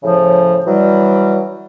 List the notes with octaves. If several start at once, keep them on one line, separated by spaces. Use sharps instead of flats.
A2 C#3 F3
E3 F#3 G3